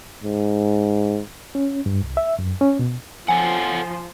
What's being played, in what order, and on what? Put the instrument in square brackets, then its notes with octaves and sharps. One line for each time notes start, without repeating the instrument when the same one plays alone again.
[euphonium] G#2
[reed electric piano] C#4
G2
C2
E5
F#2
C#4
B2
[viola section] F3 [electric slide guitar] A4 C#5 F#5 [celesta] G#5